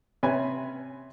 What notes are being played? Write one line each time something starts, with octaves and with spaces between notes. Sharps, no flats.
C3 C#4 B4 G#5